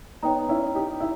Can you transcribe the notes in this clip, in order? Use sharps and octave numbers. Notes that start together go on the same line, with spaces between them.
B3 D#4 C#5 G5 A#5
C#4 E4
D#4 G4
E4